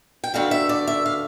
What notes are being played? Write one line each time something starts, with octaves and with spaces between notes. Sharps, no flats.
G5
D2 D3 A3 F5
E5
D5
E5
F5